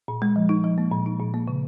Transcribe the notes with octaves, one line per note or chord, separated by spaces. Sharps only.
A#2
G#3
F3
D#4
F3
A#3
A#2
D#4
A#2
A#3
C#3